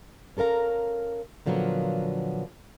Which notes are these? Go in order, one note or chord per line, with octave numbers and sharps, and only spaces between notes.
C#4 A4 A#4 F5 A#5
A#2 D3 F3 F#3 A#3 B3